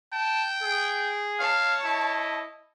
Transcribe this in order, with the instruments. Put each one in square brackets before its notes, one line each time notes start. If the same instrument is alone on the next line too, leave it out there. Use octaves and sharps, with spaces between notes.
[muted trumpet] G5 [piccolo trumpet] A5
[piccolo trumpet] G#4
[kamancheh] C#5 A5 [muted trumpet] F5
[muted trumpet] E4 [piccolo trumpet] D#5